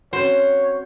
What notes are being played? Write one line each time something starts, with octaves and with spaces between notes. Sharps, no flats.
C4 C#4 F#4 C5 C#5